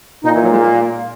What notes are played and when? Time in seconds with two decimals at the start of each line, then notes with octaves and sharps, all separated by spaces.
0.24 A#2 D#4
0.34 E3
0.43 F#3
0.51 G#3
0.59 A#3